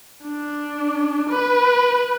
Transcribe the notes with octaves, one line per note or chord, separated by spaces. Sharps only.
D4
B4